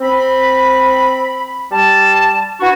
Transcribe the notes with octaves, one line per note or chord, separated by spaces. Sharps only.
C4 B5
G3 A5
B3 D4 E4 F#4